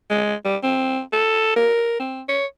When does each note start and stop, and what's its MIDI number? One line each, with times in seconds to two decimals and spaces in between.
0.10 0.35 56
0.44 0.57 55
0.64 1.01 60
1.13 1.54 69
1.56 2.00 70
2.00 2.23 60
2.29 2.46 73